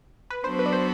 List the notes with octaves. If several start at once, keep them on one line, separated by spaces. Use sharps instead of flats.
B4
F#3 B3 D4 F#4 A4 C5
B4
D5
C5